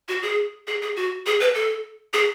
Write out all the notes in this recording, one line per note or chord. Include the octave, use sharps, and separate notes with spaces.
F#4
G#4
G#4
G#4
F#4
G#4
B4
A4
G#4